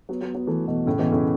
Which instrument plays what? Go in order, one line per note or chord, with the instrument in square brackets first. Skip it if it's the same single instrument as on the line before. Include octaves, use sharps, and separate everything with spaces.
[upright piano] F#3 B3
F#3 B3
F#3 B3
E3 A3
B2 E3
A2 C#3
B2 E3
A2 C#3